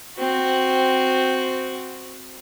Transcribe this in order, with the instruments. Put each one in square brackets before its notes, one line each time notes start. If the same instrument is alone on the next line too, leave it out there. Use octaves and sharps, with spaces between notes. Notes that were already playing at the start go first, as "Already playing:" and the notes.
[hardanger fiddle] C4 F#4